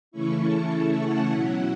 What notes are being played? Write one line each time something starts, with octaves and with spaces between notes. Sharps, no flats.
C#3 E3 A3 C#4 E4 C#6
A5
F#5
B2 F#3 C#4 E4 F#5